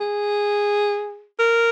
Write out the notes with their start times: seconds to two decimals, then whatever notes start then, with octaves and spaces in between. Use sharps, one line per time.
0.01 G#4
1.39 A#4